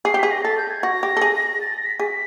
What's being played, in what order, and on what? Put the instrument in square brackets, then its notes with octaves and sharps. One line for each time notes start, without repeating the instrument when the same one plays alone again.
[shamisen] G#4 [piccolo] C7
[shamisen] G4
[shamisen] G#4 [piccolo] B6
[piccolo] A#6
[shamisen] A4 [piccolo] A6
[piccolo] G6
G#6
[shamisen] F#4 [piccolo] A#6
[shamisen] G4
A4
G#4
[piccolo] A6
A#6
B6
[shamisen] G#4 [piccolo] B6